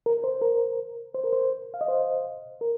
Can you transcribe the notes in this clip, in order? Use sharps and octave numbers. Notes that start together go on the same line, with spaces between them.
A#4
C5
A#4
C5
A#4
C5
F5
D#5
C5
A#4